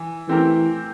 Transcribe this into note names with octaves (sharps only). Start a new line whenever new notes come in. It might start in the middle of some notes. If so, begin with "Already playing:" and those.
Already playing: E3
E3 A3 C4 G4 A#4